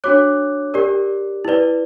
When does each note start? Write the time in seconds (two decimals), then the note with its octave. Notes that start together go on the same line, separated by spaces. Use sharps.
0.04 D4 F#4 C#5 D6 F#6
0.74 G4 A#4 D5
1.45 E4 B4 D5